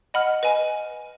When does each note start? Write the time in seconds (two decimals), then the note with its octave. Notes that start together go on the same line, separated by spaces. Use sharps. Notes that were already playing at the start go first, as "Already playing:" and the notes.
0.14 D#5 F#5 B5 F6
0.43 B4 D#5 G#5